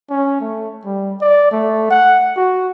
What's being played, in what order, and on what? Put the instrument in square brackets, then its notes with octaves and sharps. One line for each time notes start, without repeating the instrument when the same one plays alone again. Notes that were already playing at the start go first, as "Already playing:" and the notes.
[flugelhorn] C#4
A3
G3
D5
A3
F#5
F#4